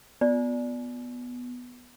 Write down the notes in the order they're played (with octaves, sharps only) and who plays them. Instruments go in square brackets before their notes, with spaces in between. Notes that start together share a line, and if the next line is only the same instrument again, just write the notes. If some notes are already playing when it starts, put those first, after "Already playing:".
[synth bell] B3 [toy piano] D5